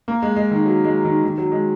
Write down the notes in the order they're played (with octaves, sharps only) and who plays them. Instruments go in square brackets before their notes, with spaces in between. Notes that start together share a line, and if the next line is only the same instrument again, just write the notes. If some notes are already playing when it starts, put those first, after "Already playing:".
[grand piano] A#3
G#3
G#3
D#3
F#3
G#3
D#3
D#3
F#3
G#3